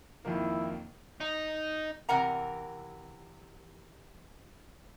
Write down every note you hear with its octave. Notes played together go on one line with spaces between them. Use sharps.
F2 D#3 A#3 E4
D#4
C3 E3 A#4 F#5 A#5